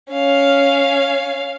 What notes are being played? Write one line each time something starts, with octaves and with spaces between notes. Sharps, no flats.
C#4 F5